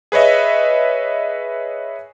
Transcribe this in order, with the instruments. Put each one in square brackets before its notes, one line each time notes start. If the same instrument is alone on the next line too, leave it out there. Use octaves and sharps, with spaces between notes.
[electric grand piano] G#4 B4 C#5 D#5 E5